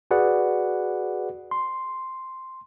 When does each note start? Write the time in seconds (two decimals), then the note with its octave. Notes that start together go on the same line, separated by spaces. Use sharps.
0.11 F#4 G#4 B4 D5 F#5
1.51 C6